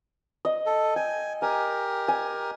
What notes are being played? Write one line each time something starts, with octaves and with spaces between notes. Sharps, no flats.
D#5
A4
G5 G#5
G4 A#4 G#5
G#5